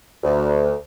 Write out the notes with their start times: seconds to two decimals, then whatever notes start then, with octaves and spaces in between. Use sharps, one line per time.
0.24 D2